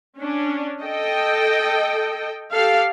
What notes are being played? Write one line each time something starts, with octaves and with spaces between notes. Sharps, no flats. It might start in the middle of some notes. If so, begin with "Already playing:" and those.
C#4 D4
A4 D#5 G5
G4 A4 F5